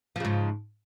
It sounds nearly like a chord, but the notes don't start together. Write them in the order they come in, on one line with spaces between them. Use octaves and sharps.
F3 C#3 G#2